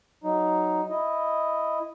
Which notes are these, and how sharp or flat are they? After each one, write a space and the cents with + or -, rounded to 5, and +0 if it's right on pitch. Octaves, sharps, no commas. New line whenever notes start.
F#3 +10 D#4 +0
E4 +0 D#5 +0